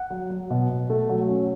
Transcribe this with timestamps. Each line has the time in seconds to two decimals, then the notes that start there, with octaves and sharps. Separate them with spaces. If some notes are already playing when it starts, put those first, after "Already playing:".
Already playing: F#5
0.10 F#3
0.30 F#3
0.50 B2
0.70 B2
0.90 A3
1.09 F#3
1.28 C#4